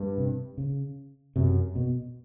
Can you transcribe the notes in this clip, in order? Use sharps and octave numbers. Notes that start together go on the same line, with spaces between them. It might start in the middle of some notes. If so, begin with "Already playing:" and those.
Already playing: G2
C3
C#3
F#2 C3
B2